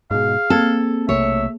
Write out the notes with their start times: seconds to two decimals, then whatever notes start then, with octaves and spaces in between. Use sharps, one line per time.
0.11 G#2 B2 G#4 F5
0.50 A#3 C4 A4 G#6
1.09 B1 C3 A3 C#5 E5